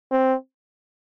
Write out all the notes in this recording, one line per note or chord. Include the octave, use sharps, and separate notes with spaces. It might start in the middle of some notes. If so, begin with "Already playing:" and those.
C4